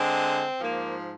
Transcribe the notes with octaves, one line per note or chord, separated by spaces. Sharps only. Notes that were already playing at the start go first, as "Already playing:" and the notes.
Already playing: D3 G#3 C4
G#2 F3 A#3